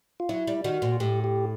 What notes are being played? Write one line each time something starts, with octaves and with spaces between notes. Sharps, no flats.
F4
F#3 E4
G3
D#3 F#4
A#2
A2 G4
G4